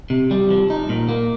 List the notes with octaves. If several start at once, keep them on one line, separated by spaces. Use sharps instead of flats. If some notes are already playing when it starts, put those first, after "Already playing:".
C3
G3
F3
D#4
A#2
A#3